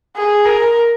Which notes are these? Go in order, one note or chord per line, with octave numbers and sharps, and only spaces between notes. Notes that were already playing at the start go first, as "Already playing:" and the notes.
G#4
A#4